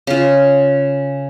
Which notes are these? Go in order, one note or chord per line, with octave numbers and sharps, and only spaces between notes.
C#3 F4